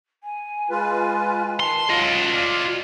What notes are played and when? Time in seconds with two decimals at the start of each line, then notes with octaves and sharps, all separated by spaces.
0.23 G#5
0.70 G#3 F4 B4
1.60 D#3 A5 C6
1.90 F#3 F4 D#5 F5
2.33 D5 F5